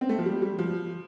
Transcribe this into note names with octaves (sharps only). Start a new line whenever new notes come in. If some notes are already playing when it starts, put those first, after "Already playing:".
C4
A3
F3
G3
G3
F3